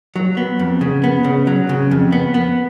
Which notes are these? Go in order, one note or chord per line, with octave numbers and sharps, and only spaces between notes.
F#3
B3
F2
C#3
B3
C#3
F#3
C#3
F2
B3
B3